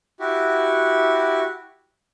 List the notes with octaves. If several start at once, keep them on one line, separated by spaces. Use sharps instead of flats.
E4 F#4 G4